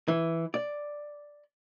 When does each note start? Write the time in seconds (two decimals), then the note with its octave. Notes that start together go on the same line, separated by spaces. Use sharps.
0.08 E3
0.54 D5